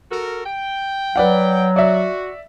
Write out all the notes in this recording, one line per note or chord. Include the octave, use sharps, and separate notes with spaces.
F#4 A4 A#4
G5
F#3 B4 D5 F#5
F#4 D5 E5